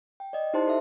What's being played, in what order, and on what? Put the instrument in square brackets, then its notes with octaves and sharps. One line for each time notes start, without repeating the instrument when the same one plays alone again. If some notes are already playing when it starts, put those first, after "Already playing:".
[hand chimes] G5
D5 D#5
D#4 E4 G4 C5 A5 C6
D#4 A4 E5